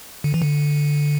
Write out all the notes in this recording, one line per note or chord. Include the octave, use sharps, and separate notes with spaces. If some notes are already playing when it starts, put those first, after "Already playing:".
D3
E3
D3